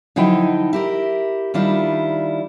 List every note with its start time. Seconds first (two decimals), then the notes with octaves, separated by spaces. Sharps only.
0.16 D3 F3 F#3 D#4 E4 G5
0.73 E4 G4 A#4
1.54 D#3 G3 D4 E4 F4